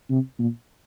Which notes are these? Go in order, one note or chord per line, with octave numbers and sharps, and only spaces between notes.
C3
A#2